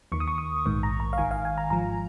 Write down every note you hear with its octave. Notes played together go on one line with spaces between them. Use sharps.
D#2 D#3 C#6
D#6
C#6
D#6
A#1 G#2 D#3 C#6
A#5
A#5
F5
G#1 G#2 D#3 G#5
F5
G#5
A#5
G#1 G#2 F3 A#5